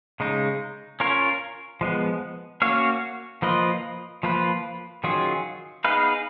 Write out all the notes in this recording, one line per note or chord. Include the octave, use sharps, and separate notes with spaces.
C#3 G#3 D#4
C#4 F4 A#4 C#5
F3 G#3 B3
A#3 C#4 F#4 C#5 F5
F3 A#3 F4 B4 D#5
F3 A#3 F4 B4
D#3 F#3 C#4 F4 G#4
B3 D#4 G#4 B4 F5